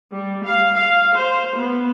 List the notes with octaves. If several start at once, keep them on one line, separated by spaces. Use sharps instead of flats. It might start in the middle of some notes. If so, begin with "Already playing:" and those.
G3
F5
F5
C5
B3